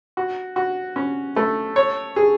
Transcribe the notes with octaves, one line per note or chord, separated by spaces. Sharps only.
F#4
F#4
C#4
A3
C#5
G#4